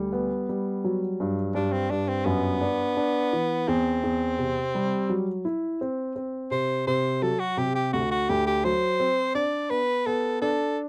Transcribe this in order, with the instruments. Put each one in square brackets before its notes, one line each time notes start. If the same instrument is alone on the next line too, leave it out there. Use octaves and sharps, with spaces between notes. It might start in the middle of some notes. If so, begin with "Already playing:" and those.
Already playing: [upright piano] D2 G3
B3
G3
F#3
G2
[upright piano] G2 [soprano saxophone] D4
[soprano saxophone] C4
[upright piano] G2 [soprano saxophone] D4
[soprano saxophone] C4
[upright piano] F#2 [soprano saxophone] B3
[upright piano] D4
D4
E3
[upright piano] E2 [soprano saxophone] C4
[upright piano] E2
C3
G3
F#3
E4
C4
C4
[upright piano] C3 [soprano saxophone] C5
[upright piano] C3 [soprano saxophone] C5
[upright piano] F#3 [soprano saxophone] A4
[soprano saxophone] F#4
[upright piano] C3 [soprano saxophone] G4
[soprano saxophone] G4
[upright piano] D2 [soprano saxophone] F#4
[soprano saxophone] F#4
[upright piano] D2 [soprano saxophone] G4
[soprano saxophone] G4
[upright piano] F#3 [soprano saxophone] C5
[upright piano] C4
[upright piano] D4 [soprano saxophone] D5
[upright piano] B3 [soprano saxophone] B4
[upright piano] B3 [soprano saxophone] A4
[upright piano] D4 [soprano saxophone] A4